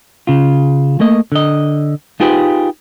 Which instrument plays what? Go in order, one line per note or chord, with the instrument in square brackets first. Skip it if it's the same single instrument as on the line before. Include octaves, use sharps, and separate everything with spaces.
[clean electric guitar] C#3 F4
A3 A#3 D#5
D3 D#5
D#4 F4 G4 G#4 B4 C5